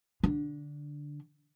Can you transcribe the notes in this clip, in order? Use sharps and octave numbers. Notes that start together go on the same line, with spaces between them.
D3